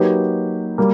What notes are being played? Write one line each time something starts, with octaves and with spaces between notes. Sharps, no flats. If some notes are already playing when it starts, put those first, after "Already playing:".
Already playing: F#3 A#3 D#4 G4 B4
G3 A#3